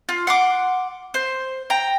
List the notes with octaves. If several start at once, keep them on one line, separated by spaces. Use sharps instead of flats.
F4
F#5 C6 D6
C5
G5 A#5